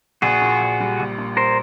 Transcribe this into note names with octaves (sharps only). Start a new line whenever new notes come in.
A#1 F#4 G#4
A#2
A#1
G3
A#1
A#2
A#4 C5